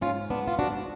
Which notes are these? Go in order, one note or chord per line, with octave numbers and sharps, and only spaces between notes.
G#2 C#4 F4
B3 D4
F4
G#2 D4 F#4